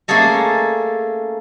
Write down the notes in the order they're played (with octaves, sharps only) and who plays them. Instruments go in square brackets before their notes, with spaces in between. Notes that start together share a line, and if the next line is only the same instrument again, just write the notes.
[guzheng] A3 A#3 C#4 G#4 A4 D#5